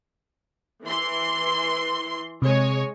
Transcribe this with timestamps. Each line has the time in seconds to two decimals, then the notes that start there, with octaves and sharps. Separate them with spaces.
0.84 E3 C6
2.42 C3 G#3 C#5 G#5